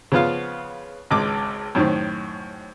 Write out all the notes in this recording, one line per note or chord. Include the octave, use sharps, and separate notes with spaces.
C#3 F3 B3 F4 F5
G#1 C#2 G#3 D6
F#2 A2 D#3 C4